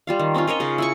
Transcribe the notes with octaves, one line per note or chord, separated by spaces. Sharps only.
G3 F4 F5
D#3
C4 C#4 D#4 F4
F4 A#4 C#5 D#5
C#3 D#4
E4 G#5 C#6